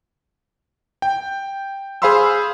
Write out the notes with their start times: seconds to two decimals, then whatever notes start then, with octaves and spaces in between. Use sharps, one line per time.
1.02 G5
2.02 G#4 C5 F5 B5 C6 E6